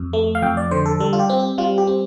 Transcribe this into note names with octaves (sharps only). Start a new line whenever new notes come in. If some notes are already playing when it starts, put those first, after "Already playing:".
Already playing: F2
A3
F5
F2 G5
D5
D3 C5
A4
G3 A4
F4
G4
C4
G4
G3 F4
G4
C4